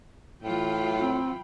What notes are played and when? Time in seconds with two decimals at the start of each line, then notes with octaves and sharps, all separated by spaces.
0.43 A2 E3 F#3 F4 G5 B5
1.00 C4